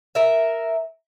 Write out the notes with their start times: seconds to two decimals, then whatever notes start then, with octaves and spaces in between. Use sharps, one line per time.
0.15 A#4 E5